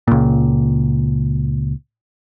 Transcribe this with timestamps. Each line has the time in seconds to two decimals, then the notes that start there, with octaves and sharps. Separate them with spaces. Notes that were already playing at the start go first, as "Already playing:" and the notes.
0.08 C#2 A#2